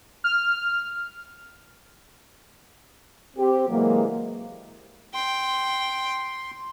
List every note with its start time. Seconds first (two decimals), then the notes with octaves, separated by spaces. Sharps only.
0.24 F6
3.37 C4 G4
3.68 C3 E3 F#3 G#3 A#3
5.15 G5 C6